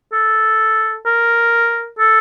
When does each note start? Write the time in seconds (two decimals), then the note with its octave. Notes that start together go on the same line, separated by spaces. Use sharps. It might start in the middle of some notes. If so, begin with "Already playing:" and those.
0.13 A4
1.06 A#4
1.99 A4